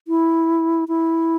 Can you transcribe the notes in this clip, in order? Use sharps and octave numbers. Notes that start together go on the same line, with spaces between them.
E4
E4